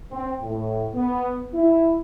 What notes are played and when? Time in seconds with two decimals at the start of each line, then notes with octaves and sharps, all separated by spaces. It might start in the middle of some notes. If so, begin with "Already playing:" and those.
0.11 C4
0.41 A2
0.94 B3
1.54 E4